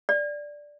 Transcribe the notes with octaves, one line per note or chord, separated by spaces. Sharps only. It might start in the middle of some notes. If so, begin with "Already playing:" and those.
D5